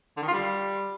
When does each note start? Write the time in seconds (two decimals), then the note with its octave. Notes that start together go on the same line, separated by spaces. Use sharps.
0.17 D3
0.22 D#3
0.28 F4
0.33 G3